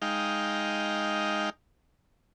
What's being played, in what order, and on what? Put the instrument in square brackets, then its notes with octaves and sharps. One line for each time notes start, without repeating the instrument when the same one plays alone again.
[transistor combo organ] G#3 D#4 F5 G5